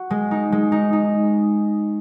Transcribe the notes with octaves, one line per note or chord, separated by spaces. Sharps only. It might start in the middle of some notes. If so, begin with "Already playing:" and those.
Already playing: F#4
G#3
D#4
G#3
D#4
D#4